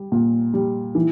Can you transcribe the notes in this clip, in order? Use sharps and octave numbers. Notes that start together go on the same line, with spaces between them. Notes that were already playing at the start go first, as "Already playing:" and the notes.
Already playing: G3
A#2
G3
E3